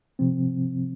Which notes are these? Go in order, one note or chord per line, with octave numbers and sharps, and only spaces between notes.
C3 F3 C4